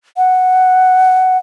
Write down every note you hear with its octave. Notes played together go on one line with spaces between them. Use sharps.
F#5